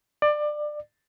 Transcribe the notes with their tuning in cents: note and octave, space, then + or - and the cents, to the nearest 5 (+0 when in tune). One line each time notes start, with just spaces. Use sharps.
D5 +25